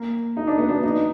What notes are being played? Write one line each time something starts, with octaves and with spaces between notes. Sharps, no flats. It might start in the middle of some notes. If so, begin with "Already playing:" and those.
Already playing: A#3
D#4
D4
B3
D4
D#4